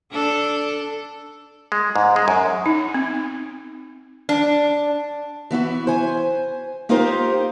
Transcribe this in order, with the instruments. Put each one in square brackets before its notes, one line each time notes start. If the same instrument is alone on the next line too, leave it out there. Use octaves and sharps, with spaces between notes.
[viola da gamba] D4 A4
[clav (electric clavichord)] G#3
G#2
G#3
F#2
[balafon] D#4
C4
[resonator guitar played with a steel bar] D4
[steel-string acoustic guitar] E3 B3 E4 F#4
C5 G#5
A#3 D#4 F4 G4 A#4 C5